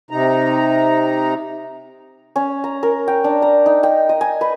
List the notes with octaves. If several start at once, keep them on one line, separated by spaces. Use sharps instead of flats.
C3 D#4 A#5
C#4
A#5
A#4
G5
D4
A#5
D#4
G5
D#5
G#5
B4